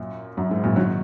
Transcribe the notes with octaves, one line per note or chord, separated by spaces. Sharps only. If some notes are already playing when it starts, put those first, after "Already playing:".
Already playing: F#2 A#2
F#2
G#2
F#2 A#2
D#3 F#3